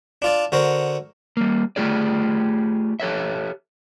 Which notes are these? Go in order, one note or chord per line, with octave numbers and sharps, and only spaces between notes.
D4 F4 D5
D3 F#4 A#4 C5
G3 A#3
A3 F4 G4 G#4 D5
G4 A4 C#5 E5